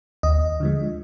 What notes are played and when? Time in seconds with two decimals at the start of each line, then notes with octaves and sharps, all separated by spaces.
0.23 D#2 D#5
0.60 D3 F3 G#3